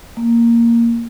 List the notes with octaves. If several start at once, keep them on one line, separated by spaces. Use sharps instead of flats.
A#3